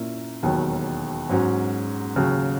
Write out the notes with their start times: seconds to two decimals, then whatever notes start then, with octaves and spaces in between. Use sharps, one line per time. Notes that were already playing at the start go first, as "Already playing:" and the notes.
Already playing: A#2 A#3 C#4 E4
0.43 E1 D#2 D#3 F#3
1.29 G#2 F#3 C#4 F#4
2.16 D#2 C#3 F#3